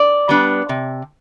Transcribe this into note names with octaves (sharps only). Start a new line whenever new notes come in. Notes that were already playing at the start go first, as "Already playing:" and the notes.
Already playing: D5
G3 B3 D4
C3